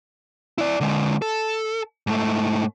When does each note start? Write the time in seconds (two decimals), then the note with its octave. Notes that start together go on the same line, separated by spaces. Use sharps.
0.58 E4 D5
0.80 D3 G#3
1.22 A4
2.07 G#2 A3